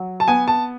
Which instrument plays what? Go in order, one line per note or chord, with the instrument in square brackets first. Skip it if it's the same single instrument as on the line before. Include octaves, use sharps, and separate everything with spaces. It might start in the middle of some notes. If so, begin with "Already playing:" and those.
Already playing: [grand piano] F#3
A5
B3 G#5
A5